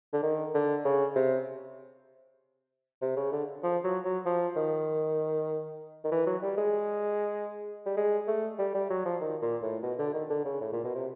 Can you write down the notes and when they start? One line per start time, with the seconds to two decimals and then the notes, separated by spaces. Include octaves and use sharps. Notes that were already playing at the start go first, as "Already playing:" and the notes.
0.13 D3
0.23 D#3
0.54 D3
0.85 C#3
1.16 C3
3.02 C3
3.17 C#3
3.32 D3
3.63 F3
3.84 F#3
4.05 F#3
4.26 F3
4.56 D#3
6.05 D#3
6.12 E3
6.26 F#3
6.42 G3
6.58 G#3
7.86 G3
7.97 G#3
8.28 A3
8.59 G3
8.75 G3
8.90 F#3
9.05 F3
9.21 D#3
9.42 A#2
9.63 A2
9.83 B2
9.98 D3
10.14 D#3
10.30 D3
10.45 C#3
10.61 A2
10.73 A#2
10.84 B2
10.95 C3